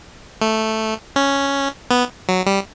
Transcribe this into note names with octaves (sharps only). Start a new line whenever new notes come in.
A3
C#4
B3
F#3
G3